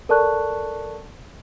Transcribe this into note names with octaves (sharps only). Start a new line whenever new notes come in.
A4 A#4 D5 A5 C#6 F#6